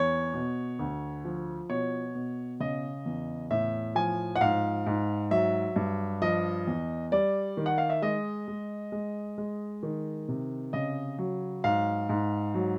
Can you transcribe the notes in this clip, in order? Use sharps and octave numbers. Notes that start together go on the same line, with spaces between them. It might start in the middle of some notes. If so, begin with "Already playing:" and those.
Already playing: E2 C#5
B2
D2
F3
B2 C#5
B2
C#3 D#5
E2
A2 E5
F3 G#5
F#5
G#2 F5
G#2
F#3 E5
G2
F3 D#5
E2
G3 D5
D#3
F#5
F5
E5
G#3 D#5
G#3
G#3
G#3
D#3
C3
C#3 D#5
F#3
G#2 F5
G#2
F#3